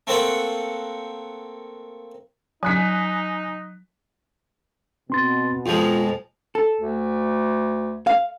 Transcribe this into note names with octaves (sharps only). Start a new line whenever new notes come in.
A3 A#3 C4 C5 F#5 G5
F#3 D#4 G#5 F#6 B6
B2 C4 C6 A6
F2 F3 G#3 F4
A4
D2
F5